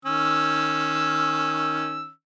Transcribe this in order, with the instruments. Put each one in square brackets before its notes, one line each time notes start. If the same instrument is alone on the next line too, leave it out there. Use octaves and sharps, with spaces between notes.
[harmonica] D#3 C#4 E6